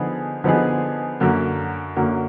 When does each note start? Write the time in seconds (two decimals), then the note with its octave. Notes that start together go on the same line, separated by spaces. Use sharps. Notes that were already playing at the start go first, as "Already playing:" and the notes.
Already playing: D3 F3 B3 D#4 G#4
0.44 D3 F3 B3 D#4 G#4
1.20 F#2 D3 F#3 A#3
1.96 F#2 D3 F#3 A#3